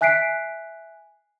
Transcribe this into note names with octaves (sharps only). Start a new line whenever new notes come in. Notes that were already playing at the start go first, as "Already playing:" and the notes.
E5 G#5 F#6 B6 C7 D7